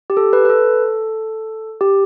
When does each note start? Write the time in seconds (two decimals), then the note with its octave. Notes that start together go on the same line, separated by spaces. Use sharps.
0.10 G4
0.17 A4
0.33 B4
0.45 B4
0.49 A4
1.81 G4